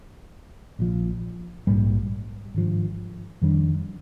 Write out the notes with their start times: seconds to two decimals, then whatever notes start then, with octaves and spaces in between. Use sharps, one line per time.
0.79 A#1 A#2 F3
1.67 A#1 G#2 G3 A#3
2.54 G#1 G2 F3
3.42 F2 D#3 G3 D4